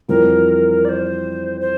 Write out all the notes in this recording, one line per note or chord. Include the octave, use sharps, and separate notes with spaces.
F2 E3 G3 C4 F4 A#4
D5
C5
C5